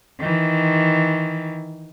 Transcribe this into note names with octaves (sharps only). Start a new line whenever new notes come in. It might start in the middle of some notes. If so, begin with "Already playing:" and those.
D#3 E3